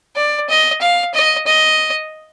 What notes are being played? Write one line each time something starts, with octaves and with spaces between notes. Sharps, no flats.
D5
D#5
F5
D#5
D#5